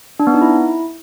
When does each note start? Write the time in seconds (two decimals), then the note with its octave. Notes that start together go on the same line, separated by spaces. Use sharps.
0.20 D4
0.27 B3
0.34 D#4
0.41 E4